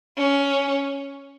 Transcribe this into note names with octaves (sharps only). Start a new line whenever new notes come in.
C#4